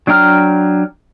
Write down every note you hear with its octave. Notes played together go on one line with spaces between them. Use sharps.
F#3 D4 G5 A#5 F6